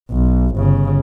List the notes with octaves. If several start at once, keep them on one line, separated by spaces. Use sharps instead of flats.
B1
G1 C#3